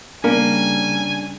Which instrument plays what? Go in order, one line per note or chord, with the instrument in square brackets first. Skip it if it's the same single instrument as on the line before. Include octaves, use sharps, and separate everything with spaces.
[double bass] C#3 G3 [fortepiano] A#3 [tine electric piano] D4 [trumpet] G#5